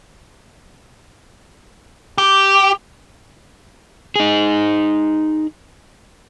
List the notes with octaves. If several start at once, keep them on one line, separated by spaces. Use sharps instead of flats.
G4 D6
D#4 G#4